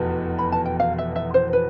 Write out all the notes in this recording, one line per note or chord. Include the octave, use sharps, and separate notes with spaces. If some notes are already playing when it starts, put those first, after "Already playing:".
Already playing: F1 E2 B2 B3
B5
A5
G5
F5
E5
E5
C5
B4